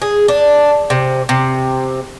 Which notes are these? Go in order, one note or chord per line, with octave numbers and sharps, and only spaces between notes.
G#4
D4
C3
C3